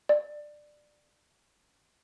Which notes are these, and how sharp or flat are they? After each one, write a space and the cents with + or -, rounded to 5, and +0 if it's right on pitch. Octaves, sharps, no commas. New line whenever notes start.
D5 +15